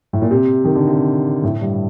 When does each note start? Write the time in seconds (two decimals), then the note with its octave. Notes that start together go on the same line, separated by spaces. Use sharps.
0.13 A2
0.22 A#2
0.31 C3
0.65 D#3
0.76 D3
0.88 C3
1.44 A2
1.61 G2